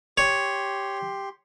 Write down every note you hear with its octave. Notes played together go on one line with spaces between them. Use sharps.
G4 C#5 C6